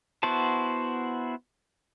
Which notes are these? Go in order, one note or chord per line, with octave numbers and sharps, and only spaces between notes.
B3 E4 F#4 C5 A5